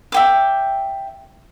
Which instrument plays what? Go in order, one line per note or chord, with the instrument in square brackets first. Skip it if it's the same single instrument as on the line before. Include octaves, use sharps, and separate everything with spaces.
[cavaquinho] E5 G5 D6